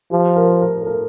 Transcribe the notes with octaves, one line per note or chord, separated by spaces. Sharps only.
F3 G4
A#4
A#4
A4
A#4